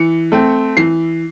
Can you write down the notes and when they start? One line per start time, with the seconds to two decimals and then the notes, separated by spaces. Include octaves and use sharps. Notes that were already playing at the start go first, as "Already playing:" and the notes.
Already playing: E3 C#7
0.32 A3 C4
0.77 E3 C7